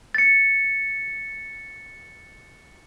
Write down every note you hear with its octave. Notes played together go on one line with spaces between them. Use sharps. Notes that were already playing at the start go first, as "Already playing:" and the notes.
A6 C#7